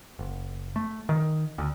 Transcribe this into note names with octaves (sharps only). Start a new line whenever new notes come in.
F#1
A3
D#3
D2